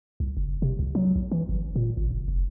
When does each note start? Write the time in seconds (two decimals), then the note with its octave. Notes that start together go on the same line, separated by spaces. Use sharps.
0.20 C2
0.37 F#1
0.62 C3
0.79 C2
0.95 F#3
1.16 B1
1.32 E3
1.49 G1
1.76 A#2
1.97 G#1
2.11 F#1
2.28 F1